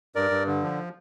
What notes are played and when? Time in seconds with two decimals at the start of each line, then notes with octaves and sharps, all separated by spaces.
0.15 G2 A#4 D5
0.31 G2
0.47 D3
0.62 F3